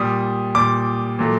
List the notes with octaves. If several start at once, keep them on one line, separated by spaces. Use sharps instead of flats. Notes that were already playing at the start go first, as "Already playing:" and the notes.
Already playing: A#2 G3 D#6
A#2 G3 D6
A#2 F#3 A3